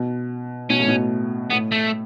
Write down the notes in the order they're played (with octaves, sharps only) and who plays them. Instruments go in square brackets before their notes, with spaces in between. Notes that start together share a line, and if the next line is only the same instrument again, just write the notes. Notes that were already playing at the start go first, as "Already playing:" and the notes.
Already playing: [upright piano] B2
[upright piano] B2 [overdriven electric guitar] C#4
[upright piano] A2
B2
[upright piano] A2 [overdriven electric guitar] B3
[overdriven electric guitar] A3